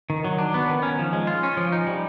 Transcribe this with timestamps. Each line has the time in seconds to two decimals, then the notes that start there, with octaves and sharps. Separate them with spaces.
0.10 D#3
0.25 F#3
0.38 D4
0.54 B3
0.69 D#3
0.83 C#4
0.99 F3
1.13 G#3
1.27 F4
1.43 C#4
1.57 F3
1.72 D#4
1.87 G3